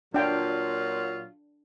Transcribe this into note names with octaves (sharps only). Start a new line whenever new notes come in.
A#2 F#3 D4 F4 G5